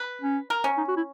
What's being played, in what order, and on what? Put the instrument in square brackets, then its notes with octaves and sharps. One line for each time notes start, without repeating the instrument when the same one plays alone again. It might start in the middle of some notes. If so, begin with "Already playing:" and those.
Already playing: [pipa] B4
[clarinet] C#4
[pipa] A#4
C#4
[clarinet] D#4
F#4
E4